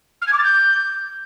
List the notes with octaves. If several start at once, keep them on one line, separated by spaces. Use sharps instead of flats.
F6
G#6
D6
A6
G6